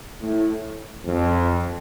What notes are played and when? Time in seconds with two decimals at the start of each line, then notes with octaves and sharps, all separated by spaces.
0.21 A2
1.05 F2